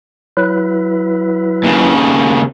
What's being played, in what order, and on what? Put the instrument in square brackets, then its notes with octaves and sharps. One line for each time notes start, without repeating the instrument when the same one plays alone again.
[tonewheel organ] F#3 E4 B4
[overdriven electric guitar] D#2 C#3